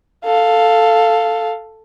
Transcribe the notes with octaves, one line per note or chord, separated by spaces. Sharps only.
A4 F5